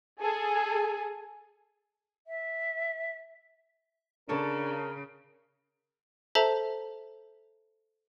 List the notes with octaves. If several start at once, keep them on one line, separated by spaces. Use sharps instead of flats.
G#4 A4 G#5
E5
C#3 D4 A4 A#4 C#5 A5
A4 C5 E5 A5 A#5